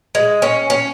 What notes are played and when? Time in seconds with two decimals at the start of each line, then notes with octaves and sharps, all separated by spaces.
0.15 G#3
0.42 C#4
0.70 C#4